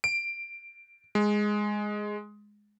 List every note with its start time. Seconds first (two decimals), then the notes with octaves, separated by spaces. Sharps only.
0.04 D7
1.15 G#3